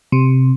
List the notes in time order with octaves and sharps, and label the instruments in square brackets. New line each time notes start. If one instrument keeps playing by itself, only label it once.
[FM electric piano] C3